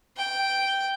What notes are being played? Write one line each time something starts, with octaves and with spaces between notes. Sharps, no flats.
G5